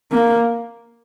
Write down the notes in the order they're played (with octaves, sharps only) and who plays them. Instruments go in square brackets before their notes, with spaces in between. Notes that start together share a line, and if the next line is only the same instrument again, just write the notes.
[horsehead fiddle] A#3